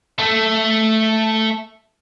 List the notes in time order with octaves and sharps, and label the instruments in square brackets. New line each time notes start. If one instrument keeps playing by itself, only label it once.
[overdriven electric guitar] A3 A4